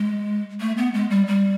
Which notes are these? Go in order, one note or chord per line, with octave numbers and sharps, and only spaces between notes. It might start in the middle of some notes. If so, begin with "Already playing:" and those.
Already playing: G#3
A3
B3
G#3
G3
G3